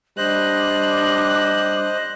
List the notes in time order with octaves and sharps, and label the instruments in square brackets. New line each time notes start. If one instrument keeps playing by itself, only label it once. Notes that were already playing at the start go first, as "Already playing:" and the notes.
[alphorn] G3 [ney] D4 [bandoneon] C5 D#5 [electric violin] F#6